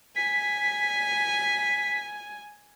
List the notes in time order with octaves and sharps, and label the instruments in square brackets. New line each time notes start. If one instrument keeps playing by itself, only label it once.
[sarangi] G#5 [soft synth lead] B6